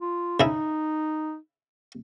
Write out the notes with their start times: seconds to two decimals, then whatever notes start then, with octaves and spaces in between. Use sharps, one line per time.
0.01 F4
0.40 C#3 D#4 E4